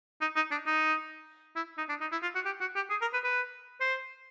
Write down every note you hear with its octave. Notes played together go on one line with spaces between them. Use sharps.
D#4
D#4
D4
D#4
E4
D#4
D4
D#4
E4
F4
F#4
G4
F#4
G4
G#4
A#4
B4
B4
C5